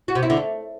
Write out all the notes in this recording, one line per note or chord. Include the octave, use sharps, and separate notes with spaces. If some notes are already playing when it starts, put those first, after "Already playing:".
F#4
C3
E4
D3
A3